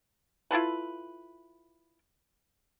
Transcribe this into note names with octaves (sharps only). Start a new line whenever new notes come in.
E4 F4 A4 B4